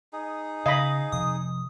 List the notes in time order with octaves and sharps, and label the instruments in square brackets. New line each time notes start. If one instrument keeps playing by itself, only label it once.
[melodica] D#4 G#4
[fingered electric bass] C#3 [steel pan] D#5 B5 [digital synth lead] F5
[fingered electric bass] C3 F3 [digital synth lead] D#6